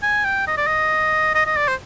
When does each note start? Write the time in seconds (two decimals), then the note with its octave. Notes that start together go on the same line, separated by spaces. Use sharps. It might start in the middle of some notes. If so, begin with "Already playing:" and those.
0.03 G#5
0.25 G5
0.47 D#5
0.57 D5
0.67 D#5
1.35 D#5
1.46 D#5
1.56 D5
1.68 C5